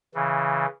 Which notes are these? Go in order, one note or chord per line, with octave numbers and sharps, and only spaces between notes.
C#3 E3